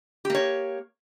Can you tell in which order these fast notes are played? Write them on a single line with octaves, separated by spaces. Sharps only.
G4 A#3 C#5